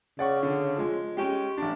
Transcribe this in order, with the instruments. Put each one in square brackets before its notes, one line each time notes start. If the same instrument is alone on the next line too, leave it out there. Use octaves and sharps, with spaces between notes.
[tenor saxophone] C#3 [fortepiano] D5 F#5 C#6
[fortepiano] D3
F3 G#3
[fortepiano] G#3 C#4 [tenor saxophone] G4
[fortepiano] A1 D4